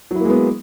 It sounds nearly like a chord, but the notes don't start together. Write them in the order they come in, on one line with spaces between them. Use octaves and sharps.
F#3 E4 A#3 G#3 B3